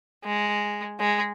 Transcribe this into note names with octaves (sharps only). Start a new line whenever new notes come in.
G#3
G#3